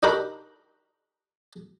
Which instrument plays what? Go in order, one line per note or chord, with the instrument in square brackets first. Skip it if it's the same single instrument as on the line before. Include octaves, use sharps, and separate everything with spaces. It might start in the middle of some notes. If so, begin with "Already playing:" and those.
[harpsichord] D4 D#4 F#4 G4 A#4 B5